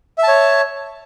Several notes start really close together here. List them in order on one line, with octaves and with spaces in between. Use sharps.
E5 A5 C#5